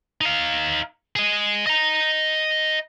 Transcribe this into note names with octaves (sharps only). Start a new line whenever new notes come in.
D#4 F5
G#4 D#5
D#5 A#5